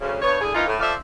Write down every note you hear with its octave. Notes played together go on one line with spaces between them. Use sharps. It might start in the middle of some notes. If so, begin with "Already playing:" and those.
D2 C#3
G2 B3 C#5
D3 E4 G#4
E3 A#3 D#4 F4
A2
F3 A4 D5 E5 F5